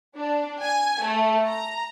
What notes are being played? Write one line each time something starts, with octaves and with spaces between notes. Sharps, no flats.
D4
G#5
A3
A#5